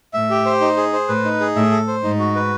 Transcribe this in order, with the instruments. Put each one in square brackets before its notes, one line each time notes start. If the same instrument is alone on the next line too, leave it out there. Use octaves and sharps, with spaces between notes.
[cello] A2 [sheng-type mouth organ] E5
[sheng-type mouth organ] G4
C5
D#4
G#4
C5
[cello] A2 [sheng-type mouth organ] B4
[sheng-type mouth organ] D#4
G#4
[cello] A2 [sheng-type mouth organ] E5
[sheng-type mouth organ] A4
C5
[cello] G#2 [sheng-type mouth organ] D#4
[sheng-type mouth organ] F#4
B4